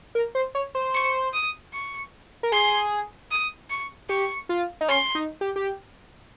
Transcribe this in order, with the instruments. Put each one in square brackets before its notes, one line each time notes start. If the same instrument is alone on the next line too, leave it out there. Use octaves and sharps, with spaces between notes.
[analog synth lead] A#4
C5
C#5
C5
[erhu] C#6
D#6
C#6
[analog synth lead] A#4
[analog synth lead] G#4 [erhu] C6
[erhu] D#6
C#6
[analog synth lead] G4 [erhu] C#6
[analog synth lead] F4
D#4
[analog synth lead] C#4 [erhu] C6
[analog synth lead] D#4
G4
G4